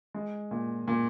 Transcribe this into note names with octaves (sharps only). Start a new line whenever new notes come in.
G#3
A#2
A#2